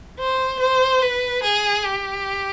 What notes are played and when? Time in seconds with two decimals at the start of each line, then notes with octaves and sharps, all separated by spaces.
0.19 C5
0.60 C5
1.02 B4
1.43 G#4
1.85 G4